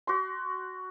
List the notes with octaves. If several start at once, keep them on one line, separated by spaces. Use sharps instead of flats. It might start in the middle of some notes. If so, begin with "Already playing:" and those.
F#4 C6